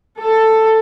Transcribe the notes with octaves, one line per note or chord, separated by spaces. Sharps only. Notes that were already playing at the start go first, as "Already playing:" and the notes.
A4